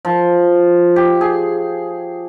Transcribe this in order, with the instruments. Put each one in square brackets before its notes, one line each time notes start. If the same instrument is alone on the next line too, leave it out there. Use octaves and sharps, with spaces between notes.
[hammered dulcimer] F3
G4
G#4